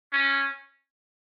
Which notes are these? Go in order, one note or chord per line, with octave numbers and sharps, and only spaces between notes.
C#4